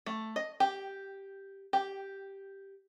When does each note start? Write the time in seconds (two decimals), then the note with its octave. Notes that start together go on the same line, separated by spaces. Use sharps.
0.06 A3
0.36 D#5
0.60 G4
1.73 G4